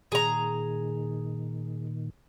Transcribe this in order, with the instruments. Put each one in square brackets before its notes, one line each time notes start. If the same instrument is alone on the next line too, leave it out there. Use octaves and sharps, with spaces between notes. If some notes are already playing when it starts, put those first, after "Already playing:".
[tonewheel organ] A#2 D#3 [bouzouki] G#4 A#5